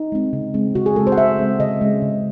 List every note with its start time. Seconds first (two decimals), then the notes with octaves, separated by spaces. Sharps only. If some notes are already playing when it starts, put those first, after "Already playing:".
Already playing: D#4
0.12 G#3 C4
0.33 C#3
0.54 G#3 C4
0.75 C#3 F#4
0.86 G#4
0.96 G#3 C4 A4
1.07 C5
1.12 F#5
1.18 C#3 E5
1.39 G#3 C4
1.60 C#3 D#5
1.81 G#3 C#4
2.02 C#3